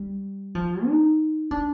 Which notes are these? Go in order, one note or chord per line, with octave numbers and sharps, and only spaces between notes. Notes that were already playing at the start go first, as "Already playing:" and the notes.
Already playing: G3
F3
D#4
D4